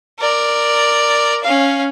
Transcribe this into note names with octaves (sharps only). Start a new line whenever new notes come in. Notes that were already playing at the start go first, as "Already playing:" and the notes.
A#4 D5
C#4 F5